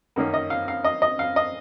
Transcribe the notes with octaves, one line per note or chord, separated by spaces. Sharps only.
F#2 D#3 A#3 C#4
D#5
F5
F5
D#5
D#5
F5
D#5